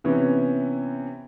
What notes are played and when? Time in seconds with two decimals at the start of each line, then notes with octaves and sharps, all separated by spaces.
0.04 C3 E3 B3 C#4